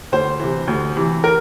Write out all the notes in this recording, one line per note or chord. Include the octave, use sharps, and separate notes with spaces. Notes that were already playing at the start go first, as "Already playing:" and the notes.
D2 C5
C3 E3
D2
C3 E3
A#4